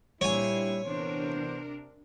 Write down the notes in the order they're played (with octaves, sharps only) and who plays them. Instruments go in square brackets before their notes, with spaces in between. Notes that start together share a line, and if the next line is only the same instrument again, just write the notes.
[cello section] A#2 D4 C5 [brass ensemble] G3 E4 [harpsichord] C#5 G#5
[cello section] C3 D4 A#4 [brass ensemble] E3 B3 C5